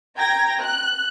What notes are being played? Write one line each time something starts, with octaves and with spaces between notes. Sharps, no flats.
G5 A#5 G#6 A#6
F#6